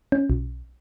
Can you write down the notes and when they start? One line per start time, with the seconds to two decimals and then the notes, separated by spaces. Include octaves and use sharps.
0.12 C#4
0.30 B1